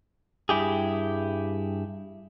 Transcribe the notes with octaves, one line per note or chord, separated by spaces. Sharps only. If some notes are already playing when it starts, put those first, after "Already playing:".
G2 E4 G4 G#4